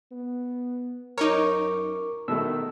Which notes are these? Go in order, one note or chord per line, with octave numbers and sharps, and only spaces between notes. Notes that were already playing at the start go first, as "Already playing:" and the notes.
B3
F#2 D#4 A#4 C#5 C#6 D6
B2 D#3 A3 E6